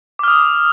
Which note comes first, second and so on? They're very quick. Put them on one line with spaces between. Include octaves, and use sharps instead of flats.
D6 F6 D#6